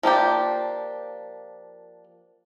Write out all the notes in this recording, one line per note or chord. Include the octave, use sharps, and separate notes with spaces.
F3 A#3 D4 G4